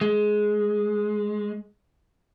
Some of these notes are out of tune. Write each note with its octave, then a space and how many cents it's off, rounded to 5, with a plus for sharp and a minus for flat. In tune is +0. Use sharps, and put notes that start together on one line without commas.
G#3 +10